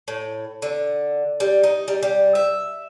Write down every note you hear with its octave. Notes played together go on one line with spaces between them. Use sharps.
A2
D3
G3
D#4
G3
G3
E5